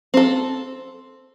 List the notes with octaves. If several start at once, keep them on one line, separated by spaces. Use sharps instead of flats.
C4 A4